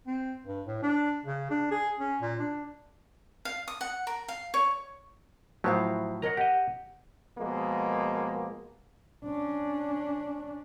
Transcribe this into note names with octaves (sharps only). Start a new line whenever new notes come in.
C4
G2
A2
D4
C#3
D4
G#4
C#4
A#2
D4
F5
D#6
F#5
A#4
F5
C#5
A2 F3 F#3 E4 C5 F5
A#4 C#5 D#5 F#5 A#5
G4 D#5 F#5
B2 F3 G#3 A#3
C#4 D4